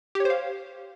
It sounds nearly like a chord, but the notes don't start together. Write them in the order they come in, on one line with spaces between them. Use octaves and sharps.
G4 C#5 C5 F5